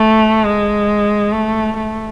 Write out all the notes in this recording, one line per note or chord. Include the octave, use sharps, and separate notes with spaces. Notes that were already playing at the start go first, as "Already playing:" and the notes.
Already playing: A3
G#3
A3
A3